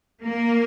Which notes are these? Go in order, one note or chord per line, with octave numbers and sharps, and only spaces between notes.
A#3